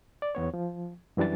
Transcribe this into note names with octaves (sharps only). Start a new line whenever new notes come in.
D5
E2 B3 C#5
F3
F#2 E3 G3 D4 A6